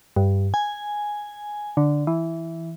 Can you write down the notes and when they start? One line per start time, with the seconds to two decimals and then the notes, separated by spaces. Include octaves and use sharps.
0.16 G2
0.54 G#5
1.77 D3
2.07 E3